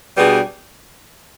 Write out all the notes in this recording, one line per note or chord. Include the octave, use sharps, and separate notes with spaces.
B2 G3 B3 D4 G#4